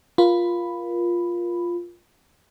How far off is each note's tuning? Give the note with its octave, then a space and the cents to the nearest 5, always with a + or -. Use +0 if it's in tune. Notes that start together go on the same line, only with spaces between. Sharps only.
F4 +0 A#4 +30 B5 +5